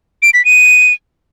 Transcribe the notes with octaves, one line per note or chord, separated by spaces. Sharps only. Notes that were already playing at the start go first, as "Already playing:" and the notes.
D7
B6
D#7